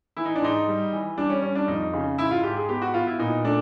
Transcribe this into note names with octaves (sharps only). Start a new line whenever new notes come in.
E3 E4
D#4
D4
G#2 D#4
G3
E3
G3 D4
C#4
G3 C#4
D4
F2 D#4
C#3
G#2 E4
F4
G#2 G4
G#4
B3 G4
F#4
B3 F4
E4
A#2 D#4
A3 D4